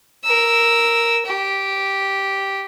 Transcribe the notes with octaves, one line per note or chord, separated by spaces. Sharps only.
A#4 E6
G4